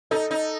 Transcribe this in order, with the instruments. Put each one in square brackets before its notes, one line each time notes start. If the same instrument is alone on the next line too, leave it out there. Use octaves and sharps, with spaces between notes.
[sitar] D#4 [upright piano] A4
[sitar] D#4